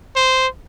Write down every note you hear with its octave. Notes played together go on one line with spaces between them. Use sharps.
C5